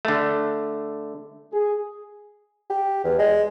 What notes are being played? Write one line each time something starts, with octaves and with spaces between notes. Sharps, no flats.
D3 A3
G#4
G4
E2
G#3